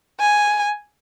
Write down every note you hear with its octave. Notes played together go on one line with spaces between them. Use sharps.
G#5